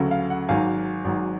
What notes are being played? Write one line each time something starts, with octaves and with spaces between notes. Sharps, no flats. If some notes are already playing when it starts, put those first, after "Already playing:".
Already playing: D2 C#3 F#3 A3
F5
F#5
G#1 G#2 F#3 F5 G#5
G#1 G#2 F#3